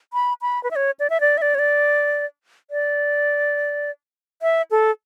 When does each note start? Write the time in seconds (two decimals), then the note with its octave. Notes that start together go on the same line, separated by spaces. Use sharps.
0.13 B5
0.42 B5
0.63 B4
0.71 E5
0.76 C#5
1.00 D5
1.10 E5
1.21 D5
1.38 E5
1.42 D5
1.55 C#5
1.59 D5
2.71 D5
4.42 E5
4.71 A4